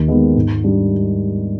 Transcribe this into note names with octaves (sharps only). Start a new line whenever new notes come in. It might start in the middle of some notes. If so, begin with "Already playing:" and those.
Already playing: D#2
D#3 G#3 B3
G#2
G3 D4